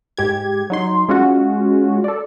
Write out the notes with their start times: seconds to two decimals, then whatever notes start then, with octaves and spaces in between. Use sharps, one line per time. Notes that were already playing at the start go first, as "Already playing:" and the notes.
0.17 G#2 G4 G#6
0.70 F#3 D#4 C6
1.09 G#3 C#4 F4 F#4
2.04 A4 D5